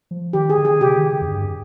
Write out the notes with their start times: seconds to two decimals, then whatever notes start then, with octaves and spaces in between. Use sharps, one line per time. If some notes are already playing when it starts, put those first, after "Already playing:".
0.11 F3
0.33 D#3 G4
0.50 G#4
0.58 D3
0.65 G#4
0.81 C3 G4
0.97 D#3
1.13 D3
1.21 F2
1.28 G2